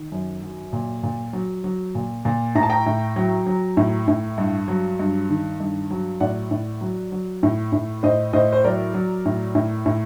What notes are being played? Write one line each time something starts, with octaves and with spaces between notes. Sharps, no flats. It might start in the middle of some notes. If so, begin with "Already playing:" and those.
Already playing: D#3
F#2
F#3
A#2
A#2
F#3
F#3
A#2
A#2
A2 A#5
A5
G5 A#5
A2
F#3
F#3
A2
A2
G2
F#3
G2
D#3
G2
F#3
A2 D5 F#5
A2
F#3
F#3
A2
A2
A2 C5 D#5
A2 C5 D#5
C5
F#3 A#4 D5
F#3
A2
A2
A2